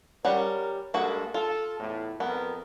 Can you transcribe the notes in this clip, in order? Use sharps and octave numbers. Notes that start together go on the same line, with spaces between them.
G3 C#4 A#4 F#5
G2 G#3 A#3 F#4 A4
F4 A4
E2 A2
F2 B3 A#4